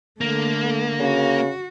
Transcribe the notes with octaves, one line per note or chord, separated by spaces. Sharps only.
D3 A3 A#3
C#3 F#4